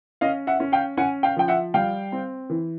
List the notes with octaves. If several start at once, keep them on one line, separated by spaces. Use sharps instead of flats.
C#4 D#5 F5
E5 F#5
C#4
F5 G5
C#4 F#5 G#5
F5 G5
F3 G5
E5 F#5
G3 F5 G5
C4
E3